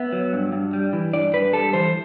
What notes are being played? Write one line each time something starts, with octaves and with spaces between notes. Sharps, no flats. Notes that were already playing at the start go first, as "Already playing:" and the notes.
Already playing: B3 E5
F#3
G2
G2
G3
E3
G2 D5
G2 B4
G3 A4
E3 C5